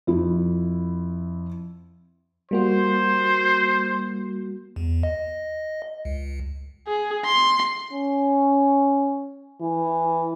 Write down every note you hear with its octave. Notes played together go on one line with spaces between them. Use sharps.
F2 E4
G3 A#3 F#4 C5
E2
D#5
C#2
G#4
C6
C#4
E3